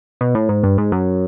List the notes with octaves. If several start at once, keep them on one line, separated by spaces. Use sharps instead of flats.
B2
A2
G#2
G2
G#2
F#2